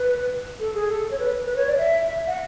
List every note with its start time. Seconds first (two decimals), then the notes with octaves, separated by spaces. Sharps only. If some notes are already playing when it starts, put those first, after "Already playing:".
Already playing: B4
0.60 A4
0.74 G#4
0.88 A4
1.11 C#5
1.19 B4
1.45 B4
1.56 C#5
1.67 D5
1.77 E5
2.27 F#5